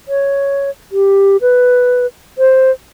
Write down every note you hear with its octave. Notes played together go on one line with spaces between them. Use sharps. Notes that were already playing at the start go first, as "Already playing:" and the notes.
C#5
G4
B4
C5